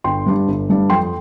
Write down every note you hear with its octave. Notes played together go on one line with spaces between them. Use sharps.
G1 G5 C6
G2 G3 D4
G1
G2 G3 D4
F2 G5 C6